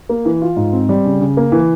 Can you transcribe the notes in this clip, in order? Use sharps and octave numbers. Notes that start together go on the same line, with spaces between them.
A#3
E3
F4
G#2
C4
G3
C#3
C#3
A#3
E3